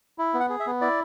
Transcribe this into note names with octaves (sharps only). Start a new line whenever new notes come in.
E4
B3
F#5
G#4
E5
B3
E4 D5